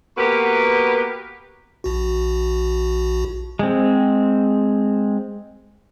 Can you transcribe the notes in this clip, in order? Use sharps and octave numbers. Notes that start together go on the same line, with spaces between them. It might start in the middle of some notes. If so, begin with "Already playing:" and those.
A#3 B3 F#4 G4 A#4 B4
A#1 F#4
G#3 C4